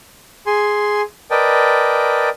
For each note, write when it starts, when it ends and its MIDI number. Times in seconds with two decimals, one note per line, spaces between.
0.46 1.02 68
0.46 1.02 80
0.46 1.02 84
1.31 2.29 70
1.31 2.29 71
1.31 2.29 74
1.31 2.29 75
1.31 2.29 79
1.31 2.29 81